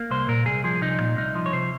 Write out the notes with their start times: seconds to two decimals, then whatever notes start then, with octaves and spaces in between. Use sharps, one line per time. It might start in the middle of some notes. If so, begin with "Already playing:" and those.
Already playing: A#3
0.11 C2 C5
0.28 A#2 A#4
0.46 C2 G#4
0.64 F3 G#4
0.81 C2 D#4
1.00 A#2
1.17 C2 D#4
1.35 F3
1.46 C#5
1.53 C3 C5